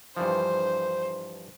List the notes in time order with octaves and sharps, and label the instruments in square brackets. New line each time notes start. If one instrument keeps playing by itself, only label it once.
[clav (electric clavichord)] G2 E3 F3 [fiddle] C5